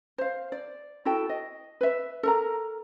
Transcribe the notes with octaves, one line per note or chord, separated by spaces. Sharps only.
C5 F5
D5
E4 F#4 A4 G5
D#5
B4 E5
A4 A#4 A#5